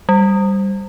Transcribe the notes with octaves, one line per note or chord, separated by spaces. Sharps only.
G3